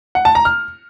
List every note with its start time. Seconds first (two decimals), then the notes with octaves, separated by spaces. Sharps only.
0.15 F#5
0.25 A5
0.35 A#5
0.45 F6